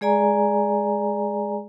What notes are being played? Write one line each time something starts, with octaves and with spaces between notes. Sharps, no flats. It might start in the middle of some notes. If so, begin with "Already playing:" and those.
G#3 G#4 D5 G#5 A#5